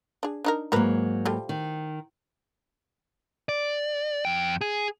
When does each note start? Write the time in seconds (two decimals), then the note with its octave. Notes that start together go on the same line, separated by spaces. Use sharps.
0.23 D4 G#4
0.44 D4 D#4 A#4
0.72 G#2 F#3 A#3 F#4 A#4 B4
1.25 F3 G3 A3
1.49 D#3
3.49 D5
4.25 F2 G5
4.61 G#4